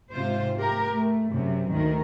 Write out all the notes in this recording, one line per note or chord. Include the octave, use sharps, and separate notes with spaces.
G#2 C3 F4 C5
A3 G4 A#4
A3
F#2 C3
D2 D#3 A3 A#4